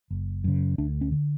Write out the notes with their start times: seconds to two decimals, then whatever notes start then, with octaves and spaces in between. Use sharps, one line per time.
0.10 F#1
0.44 F#2 C#3
0.78 D2 D4
1.01 C#4
1.11 D3